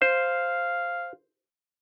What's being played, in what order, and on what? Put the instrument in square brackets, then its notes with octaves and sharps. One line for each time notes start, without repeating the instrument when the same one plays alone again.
[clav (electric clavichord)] C5 [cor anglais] F5